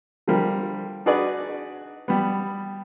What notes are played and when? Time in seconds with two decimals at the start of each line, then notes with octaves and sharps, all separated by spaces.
0.28 D3 F3 G3 A#4
1.06 D4 D#4 F#4 G#4 B4 D5
2.08 G3 B3